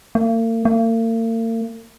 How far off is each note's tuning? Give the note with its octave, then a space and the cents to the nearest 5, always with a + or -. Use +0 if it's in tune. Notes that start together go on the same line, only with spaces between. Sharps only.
A#3 -45
A#3 -45